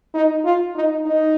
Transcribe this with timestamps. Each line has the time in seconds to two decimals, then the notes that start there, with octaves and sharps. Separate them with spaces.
0.14 D#4
0.45 F4
0.76 D#4
1.07 D#4